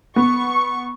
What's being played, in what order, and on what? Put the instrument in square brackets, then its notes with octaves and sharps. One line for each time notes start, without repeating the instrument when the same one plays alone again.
[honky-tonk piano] B3 [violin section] C#6